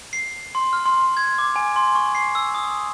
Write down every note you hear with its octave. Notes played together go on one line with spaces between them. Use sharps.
C7
C6
F6
C6
G#6
D6
G#5
C6
C#6
C7
E6
D#6